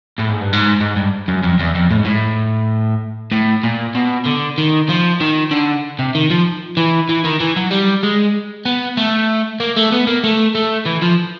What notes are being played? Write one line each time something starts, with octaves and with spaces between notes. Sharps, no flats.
A2
G#2
G2
G#2
G#2
G2
F#2
F2
E2
F2
A2
G#2
A2
A2
A#2
B2
D3
D#3
F3
D#3
D3
C3
D#3
F3
E3
E3
D#3
E3
F#3
G3
G#3
B3
A3
A#3
A3
B3
A#3
A3
A3
E3
F3